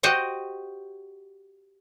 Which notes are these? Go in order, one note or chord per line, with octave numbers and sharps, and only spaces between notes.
F#4 G4 C5 D#5 F#5